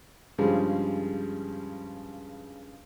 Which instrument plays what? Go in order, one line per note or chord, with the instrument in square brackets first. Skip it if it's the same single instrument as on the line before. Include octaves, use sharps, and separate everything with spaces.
[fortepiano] G2 C#3 F3 G3 G#3